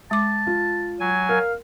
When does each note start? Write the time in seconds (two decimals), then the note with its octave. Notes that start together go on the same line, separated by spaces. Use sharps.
0.11 G#3 A5 D6
0.47 F4
1.00 F#3 G#5
1.29 A#4 F5